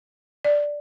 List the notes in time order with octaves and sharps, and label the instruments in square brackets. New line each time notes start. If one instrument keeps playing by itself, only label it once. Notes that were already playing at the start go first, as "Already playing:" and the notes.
[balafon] D5